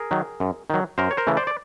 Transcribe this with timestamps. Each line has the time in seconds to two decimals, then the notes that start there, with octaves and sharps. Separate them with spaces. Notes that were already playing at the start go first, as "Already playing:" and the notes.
Already playing: G#4 A#4
0.11 D#3 F#3
0.40 F#2
0.70 D#3 F#3
0.98 F#2 A#4 C5
1.11 C#5
1.17 A#4 C5
1.27 C#3 E3 A3
1.37 C5 D5
1.47 D5